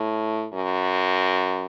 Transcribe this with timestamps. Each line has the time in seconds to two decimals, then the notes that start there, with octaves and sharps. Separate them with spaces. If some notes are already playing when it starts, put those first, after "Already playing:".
Already playing: A2
0.53 F#2